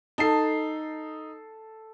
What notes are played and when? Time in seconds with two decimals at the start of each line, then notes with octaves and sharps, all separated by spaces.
0.18 D#4 A4 A5 C7